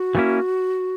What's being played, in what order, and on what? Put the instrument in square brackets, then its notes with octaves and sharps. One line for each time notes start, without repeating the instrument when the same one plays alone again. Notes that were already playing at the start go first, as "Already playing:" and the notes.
Already playing: [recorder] F#4
[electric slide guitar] E3 G3 A#3 C#4 E4